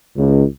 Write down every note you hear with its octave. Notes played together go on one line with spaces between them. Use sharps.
C#2